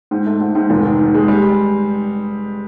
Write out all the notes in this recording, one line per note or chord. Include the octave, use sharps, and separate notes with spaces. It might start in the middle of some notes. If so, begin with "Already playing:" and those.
G#2
A3
G#2
G#2
F1
D#3
D#3
G#3
G3